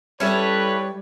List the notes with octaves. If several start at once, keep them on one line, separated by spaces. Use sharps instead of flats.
G3 C#4 E4 A4 B4 C#5